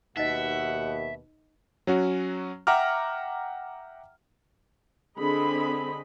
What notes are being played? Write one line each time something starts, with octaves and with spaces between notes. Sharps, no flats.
D#2 B2 D#4 D#5 E5 F#5
F#3 C#4 F#4
E5 F#5 G5 A#5 D6 F6
D3 C4 G#4 D#5 B5